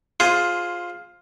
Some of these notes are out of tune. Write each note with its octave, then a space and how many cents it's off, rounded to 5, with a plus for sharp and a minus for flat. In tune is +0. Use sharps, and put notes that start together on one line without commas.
F4 +10 G#4 +5 C5 +0